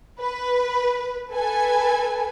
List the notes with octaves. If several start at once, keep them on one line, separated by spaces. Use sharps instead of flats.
B4
A4 B4 G#5